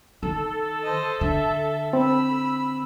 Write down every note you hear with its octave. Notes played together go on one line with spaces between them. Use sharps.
D#3 A4
C5 D#5
D3 E5
C4 B5 E6